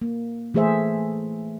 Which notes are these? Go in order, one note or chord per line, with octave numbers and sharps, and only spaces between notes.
A#3
E3 A3 G#4 C5 E5